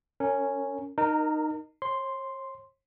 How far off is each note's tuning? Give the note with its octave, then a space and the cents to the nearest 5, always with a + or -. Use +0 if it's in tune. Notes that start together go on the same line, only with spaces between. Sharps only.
C#4 +0 A#4 -30
D#4 -15 A#4 +0 A#5 -45
C#5 -45 C6 +0